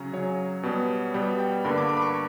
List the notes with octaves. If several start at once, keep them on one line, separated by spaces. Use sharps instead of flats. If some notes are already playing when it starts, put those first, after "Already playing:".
Already playing: C#3 F#3 C#4 A#5
C#3 F#3 C#4 C#5
B2 G3 B3
B2 G3 B3 G5
G5
G2 D3 A#3 B5
D6
D6
B5
C#6